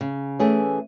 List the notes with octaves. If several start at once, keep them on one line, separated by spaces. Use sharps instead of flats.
C#3
E3 A3 C#4 G#4